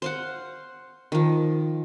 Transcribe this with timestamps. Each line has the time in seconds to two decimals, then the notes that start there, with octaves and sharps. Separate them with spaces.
0.02 C5 F5 F#5
1.12 D#3 F3